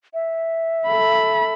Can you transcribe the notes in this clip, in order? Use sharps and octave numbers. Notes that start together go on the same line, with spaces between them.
E5
A4 B5